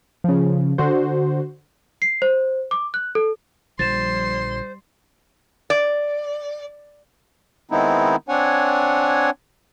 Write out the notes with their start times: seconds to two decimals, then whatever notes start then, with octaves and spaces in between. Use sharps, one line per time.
0.24 C#3 F3
0.78 D3 F#4 C5
2.02 C7
2.22 C5
2.71 D6
2.94 F#6
3.15 A4
3.79 A#1 D3 F3 G3 C5 C6 A6 E7
5.70 D5
7.71 D#3 G#3 B3 C4 D#4 E4
8.29 C4 D4 C#5 F#5 G#5